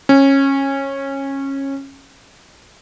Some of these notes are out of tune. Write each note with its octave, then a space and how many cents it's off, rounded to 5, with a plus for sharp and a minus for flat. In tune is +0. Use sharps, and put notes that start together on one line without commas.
C#4 -20